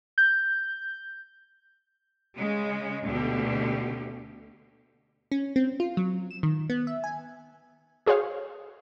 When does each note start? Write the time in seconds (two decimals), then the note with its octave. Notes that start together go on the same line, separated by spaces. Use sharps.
0.18 G6
2.35 C#3 G#3
3.05 D2 B2 D3 G4
5.32 C#4
5.56 C4
5.80 F4
5.97 F#3
6.31 E7
6.43 D#3
6.70 B3
6.87 E5
7.04 G#5
8.06 F#4 G#4 C5 C#5 F5